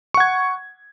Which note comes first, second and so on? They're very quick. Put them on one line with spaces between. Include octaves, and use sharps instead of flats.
C#6 F#5 G#6